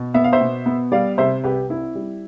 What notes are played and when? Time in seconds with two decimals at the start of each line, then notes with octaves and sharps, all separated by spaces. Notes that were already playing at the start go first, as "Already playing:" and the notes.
Already playing: B2
0.14 B3 E5
0.24 F5
0.33 C5 E5
0.41 B2
0.66 B3
0.92 G3 D5 F5
1.18 C3 C5 E5
1.44 C2 G4 B4
1.69 C4 E4
1.95 G3